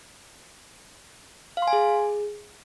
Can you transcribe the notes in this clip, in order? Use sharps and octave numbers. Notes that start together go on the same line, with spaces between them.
F5
C6
G#5
G#4